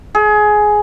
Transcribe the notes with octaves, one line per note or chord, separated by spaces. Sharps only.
G#4